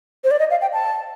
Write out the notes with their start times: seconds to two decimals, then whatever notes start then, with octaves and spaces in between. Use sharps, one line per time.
0.24 C5
0.31 D5
0.40 D#5
0.51 F5
0.61 G5
0.73 A5